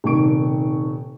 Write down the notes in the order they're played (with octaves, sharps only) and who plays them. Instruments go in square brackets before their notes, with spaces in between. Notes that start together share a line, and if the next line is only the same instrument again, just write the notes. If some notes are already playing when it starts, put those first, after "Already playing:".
[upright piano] D#1 C3 D#3 C#6 D7